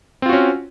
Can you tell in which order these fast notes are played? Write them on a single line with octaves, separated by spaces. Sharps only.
C4 F4 F#4 C#4